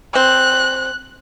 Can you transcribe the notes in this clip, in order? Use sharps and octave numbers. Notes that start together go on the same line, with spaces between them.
C4 F#6